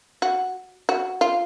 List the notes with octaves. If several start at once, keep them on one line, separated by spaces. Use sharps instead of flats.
F#4
F#4
F4